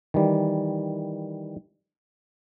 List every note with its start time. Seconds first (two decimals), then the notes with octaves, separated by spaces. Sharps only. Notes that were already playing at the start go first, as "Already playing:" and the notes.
0.14 D#3 E3 G3